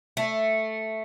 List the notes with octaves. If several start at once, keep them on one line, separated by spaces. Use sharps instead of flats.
A3